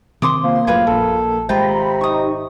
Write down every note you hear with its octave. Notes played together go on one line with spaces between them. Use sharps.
C3 D#3 C4 C6 D6 D#6
F3 A#3
G1 F#2 A2 F4 G#4 B4 F5
A#1 A4
G#1 C3 G#3 F4 G5 A#5 B5
D#4 G4 C#6 D#6